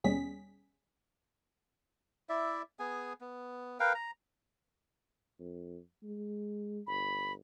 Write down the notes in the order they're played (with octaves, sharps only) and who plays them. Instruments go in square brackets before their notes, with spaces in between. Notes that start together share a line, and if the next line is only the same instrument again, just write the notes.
[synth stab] D#2 B2 G3 C#4 G#4 B6
[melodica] E4 D5 E5
B3 G#4 G#5
B3
A#4 B4 F5 G5
A#5
[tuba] F2
G#3
[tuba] G1 [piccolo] B5